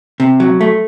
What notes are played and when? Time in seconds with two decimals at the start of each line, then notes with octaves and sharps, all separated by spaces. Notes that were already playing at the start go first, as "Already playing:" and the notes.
0.20 C3
0.40 F#3
0.61 A3